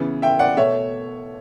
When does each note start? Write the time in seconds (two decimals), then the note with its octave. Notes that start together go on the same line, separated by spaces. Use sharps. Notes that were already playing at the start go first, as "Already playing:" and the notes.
Already playing: C#3 E3 B3
0.22 E5 G5
0.39 D5 F#5
0.57 B2 A3 C#5 E5